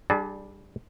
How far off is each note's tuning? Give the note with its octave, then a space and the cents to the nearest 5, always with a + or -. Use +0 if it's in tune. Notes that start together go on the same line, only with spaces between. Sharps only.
G3 +0 D4 +15 G#4 +40